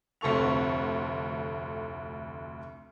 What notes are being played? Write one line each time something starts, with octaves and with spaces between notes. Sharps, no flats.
F1 D2 A4 C#6 F7